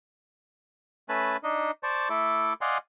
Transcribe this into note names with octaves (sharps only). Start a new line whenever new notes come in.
A3 C#4 B4 G#5 A5 B5
D4 D#4 D#5
C5 D5 A5 C#6 D6
A3 E4 A4 D6
D5 D#5 F5 F#5 G#5 C6